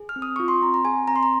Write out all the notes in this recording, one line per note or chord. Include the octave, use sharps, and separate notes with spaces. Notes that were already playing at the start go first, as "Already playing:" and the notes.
Already playing: G#4
F6
C4
D#6
F4 C#6
C6
C4 A#5
A#5
G#4 G#5
C4 A#5
C6
A#5